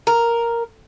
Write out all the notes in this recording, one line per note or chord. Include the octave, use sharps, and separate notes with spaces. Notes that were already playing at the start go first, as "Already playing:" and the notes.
A#4